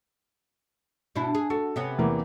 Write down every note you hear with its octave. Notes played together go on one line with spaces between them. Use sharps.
B2 D4 E4
G#4
F#4 A4
C3 B3 C#4
E2 E3 A#3